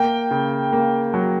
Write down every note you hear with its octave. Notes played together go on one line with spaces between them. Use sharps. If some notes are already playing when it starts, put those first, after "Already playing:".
Already playing: A#3 G5
C#3
A#3
F#3